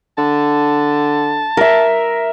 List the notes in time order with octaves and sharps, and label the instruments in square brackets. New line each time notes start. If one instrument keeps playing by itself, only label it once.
[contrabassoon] D3 [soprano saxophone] A5
[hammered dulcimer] A#4 E5